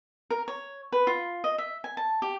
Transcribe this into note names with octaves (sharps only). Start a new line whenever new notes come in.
A#4
C#5
B4
F4
D#5
E5
G#5
A5
G4